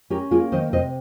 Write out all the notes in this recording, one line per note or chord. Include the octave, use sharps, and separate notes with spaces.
C#4 G4 A#4
A#3 F4 G#4
D#3 C5 D#5
C3 C5 D#5